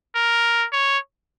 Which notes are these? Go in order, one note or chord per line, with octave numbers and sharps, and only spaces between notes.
A#4
C#5